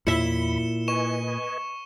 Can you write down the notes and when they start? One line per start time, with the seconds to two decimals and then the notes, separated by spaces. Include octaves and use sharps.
0.07 E2 A#2 E4 E5 B5 C#7 E7 G7
0.88 B4 D#5 G#5 C#6 E7